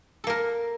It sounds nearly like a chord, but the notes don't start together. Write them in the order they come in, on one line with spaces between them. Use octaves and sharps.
A4 A#3 A#4